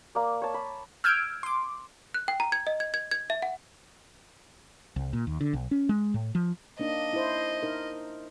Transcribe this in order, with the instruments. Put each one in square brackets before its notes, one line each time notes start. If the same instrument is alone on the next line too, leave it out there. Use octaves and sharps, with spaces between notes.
[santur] A#3 D5
C#5 A5
B5
[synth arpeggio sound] E6 F6 G6 G#6 D7
C6 D6
[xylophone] F#6
G5
A#5
G#6
D#5
G#6
G#6
G#6
E5
F#5
[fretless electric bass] C2
A#2
D#2
D3
B1
C#4
G#3
A2
F3
[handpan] A#3 D4 D#4 [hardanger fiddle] D#5
[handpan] E4 C5
D#4 A#4